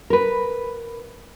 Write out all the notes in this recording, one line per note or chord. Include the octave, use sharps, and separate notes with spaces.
A#4 B4